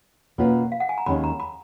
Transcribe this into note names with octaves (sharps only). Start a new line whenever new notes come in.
B2 A#3 C#4 F4 B4
F5
F#5
G#5
A#5
D#2 D#3 G#3 C#4 B5
A#5
B5